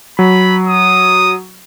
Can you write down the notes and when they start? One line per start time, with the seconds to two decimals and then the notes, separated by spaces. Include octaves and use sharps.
0.19 F#3 B5
0.68 D#6